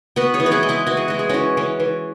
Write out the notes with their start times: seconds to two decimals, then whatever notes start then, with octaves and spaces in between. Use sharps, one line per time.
0.16 B3 F#4 B4
0.34 G#4 C#5
0.40 E3
0.46 B4
0.51 E4 G#4
0.63 G#3
0.69 E4 G#4
0.87 E3 F#4
0.97 G#4
1.08 G#3 F#4
1.19 G#4
1.29 E3 C#4 F#4
1.57 E3 C#4
1.80 E3